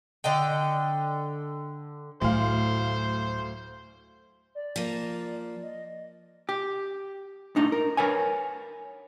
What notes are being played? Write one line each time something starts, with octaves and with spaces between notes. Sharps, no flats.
D3 A4 D#5 G5
D2 A2 F#3 C5 F5
D5
F3 A#3
D#5
G4
A2 D4 D#4
A#4
A#4 B4 C#5 G#5